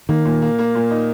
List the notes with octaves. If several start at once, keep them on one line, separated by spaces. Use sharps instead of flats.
D#3 A#3
A#2
A#3
A#3
A#2
D#4